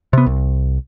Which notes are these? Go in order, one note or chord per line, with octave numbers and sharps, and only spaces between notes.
C3 B3
C2